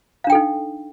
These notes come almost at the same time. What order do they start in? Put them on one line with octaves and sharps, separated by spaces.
F5 D4 G5 A4 D#4